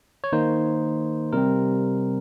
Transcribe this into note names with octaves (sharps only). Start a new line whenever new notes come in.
C#5
D#3 A#3 D#4 C5
C3 G3 C4 A#4